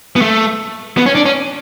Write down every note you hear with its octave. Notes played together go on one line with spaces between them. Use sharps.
B3
A3
B3
C#4
D4
C#4